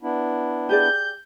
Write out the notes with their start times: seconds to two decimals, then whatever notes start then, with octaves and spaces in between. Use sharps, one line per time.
0.03 B3 D4 E4
0.69 G4 G#4 D5 G6